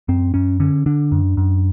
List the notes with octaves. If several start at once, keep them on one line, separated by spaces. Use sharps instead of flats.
F#2 C4
F#2 C#4
D3 C#4
D3 D4
F#2
F#2